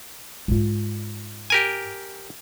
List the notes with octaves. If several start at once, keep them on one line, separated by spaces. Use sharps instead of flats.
G#2 F4
G4 A#4 G#5